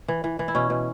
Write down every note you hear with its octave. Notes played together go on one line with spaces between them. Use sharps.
E3
E3
E3
E4
B2 C#4
B2